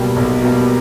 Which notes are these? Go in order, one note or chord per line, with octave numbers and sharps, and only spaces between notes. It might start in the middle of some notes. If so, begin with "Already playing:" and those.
Already playing: B1 B2 G3 A#3
B1
B2 G3 A#3